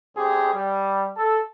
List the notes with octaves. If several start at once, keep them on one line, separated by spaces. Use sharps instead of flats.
D2 C4 C#4 G4 G#4
G3
A4